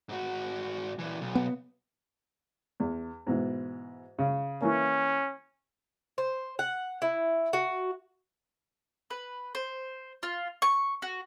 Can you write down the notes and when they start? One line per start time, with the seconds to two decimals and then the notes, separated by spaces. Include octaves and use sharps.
0.09 G#2 F#4
0.99 A#2 E3
1.21 B1
1.35 B3
2.80 E2
3.27 G#2 B2 E3
4.19 C#3
4.62 E3 A#3 C#4
6.18 C5
6.59 F#5
7.02 E4
7.53 F#4
9.10 B4
9.55 C5
10.23 F4
10.62 C#6
11.02 F#4